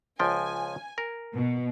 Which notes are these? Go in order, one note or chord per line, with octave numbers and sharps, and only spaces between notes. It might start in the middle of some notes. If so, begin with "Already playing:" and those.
C#2 F3 G5 G#5
A#4
B2